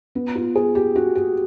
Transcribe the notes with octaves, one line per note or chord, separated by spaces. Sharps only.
B3
F4
G#4
G4
F#4
G4